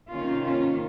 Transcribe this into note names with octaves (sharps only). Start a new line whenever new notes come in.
C3 D#3 A#3 C#4 F4
C#4 F4